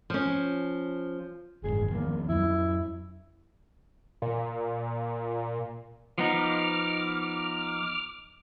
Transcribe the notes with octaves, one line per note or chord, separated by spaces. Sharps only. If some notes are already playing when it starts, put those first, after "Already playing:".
F3 C#4
F#1 G#2 G#4
D#3 F3 A#3 B3
F2 F#3 E4
A#2
F3 B3 D#4 D6 F6